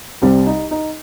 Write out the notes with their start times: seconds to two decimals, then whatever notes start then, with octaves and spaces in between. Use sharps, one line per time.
0.22 C2 C3 G3 C4
0.46 D#4
0.71 D#4